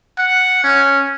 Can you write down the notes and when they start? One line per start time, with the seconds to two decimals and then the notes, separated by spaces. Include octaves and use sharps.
0.19 F#5
0.64 C#4